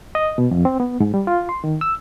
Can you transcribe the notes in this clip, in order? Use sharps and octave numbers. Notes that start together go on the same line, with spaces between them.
D#5
B2
F2
C4
B3
G#2
G3
F4
C6
D#3
E6